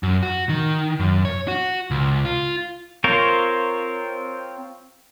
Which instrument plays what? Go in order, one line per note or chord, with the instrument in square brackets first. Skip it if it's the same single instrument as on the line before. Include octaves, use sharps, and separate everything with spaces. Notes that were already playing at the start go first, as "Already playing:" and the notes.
[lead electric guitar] F#2
F#4
D#3
F#2
C#5
F#4
C#2
F4
[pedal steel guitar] C4 F4 A#4 C5 C#5